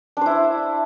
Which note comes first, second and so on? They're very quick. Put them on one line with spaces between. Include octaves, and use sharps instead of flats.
D4 C5 E4